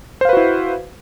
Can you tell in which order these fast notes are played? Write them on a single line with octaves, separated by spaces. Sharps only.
C5 F5 B4 F#4 E4